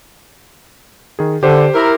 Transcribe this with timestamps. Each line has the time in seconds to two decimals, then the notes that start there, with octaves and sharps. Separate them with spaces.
1.19 D#3 G#4
1.43 D3 G4 C5
1.74 E4 A#4